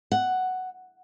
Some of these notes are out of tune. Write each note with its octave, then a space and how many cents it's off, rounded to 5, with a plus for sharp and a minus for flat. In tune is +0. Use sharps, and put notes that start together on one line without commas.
F#5 +5